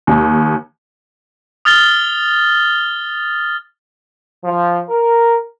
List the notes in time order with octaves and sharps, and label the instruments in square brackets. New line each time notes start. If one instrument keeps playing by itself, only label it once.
[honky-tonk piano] D#2
[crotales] D#6 F6 A6 G7
[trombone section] F3
A#4